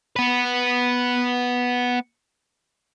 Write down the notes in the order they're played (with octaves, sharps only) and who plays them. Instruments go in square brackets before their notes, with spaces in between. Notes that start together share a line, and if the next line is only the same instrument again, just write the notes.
[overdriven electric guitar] B3 B4